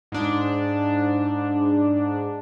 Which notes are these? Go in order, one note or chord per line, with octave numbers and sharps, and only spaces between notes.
G#2 D4